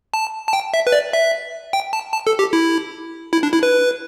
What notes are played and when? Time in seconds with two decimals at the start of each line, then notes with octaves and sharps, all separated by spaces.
0.14 A5
0.48 A5
0.53 G5
0.74 E5
0.87 B4
0.92 D5
1.13 E5
1.73 G5
1.93 A5
2.13 A5
2.27 A4
2.39 G4
2.53 E4
3.33 E4
3.43 D4
3.53 E4
3.63 B4